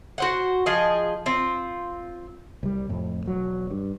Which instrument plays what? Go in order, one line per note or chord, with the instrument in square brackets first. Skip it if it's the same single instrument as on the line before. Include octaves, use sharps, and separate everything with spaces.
[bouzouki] F#4 C5 F#5
F3 G#4 D#5
C4 F4
[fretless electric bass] C2 G3
F2 A2
E1 F#3
G2